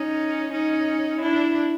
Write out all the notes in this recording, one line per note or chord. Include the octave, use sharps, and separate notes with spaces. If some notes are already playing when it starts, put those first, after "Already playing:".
Already playing: C#4 D#4
C#4 D#4
D4 E4